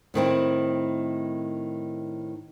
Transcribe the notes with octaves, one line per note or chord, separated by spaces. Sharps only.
A2 D#3 C4 E4